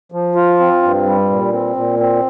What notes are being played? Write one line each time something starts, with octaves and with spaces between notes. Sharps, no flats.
F3
F4
C4
G2
G3
A#2
C4
A#2
C4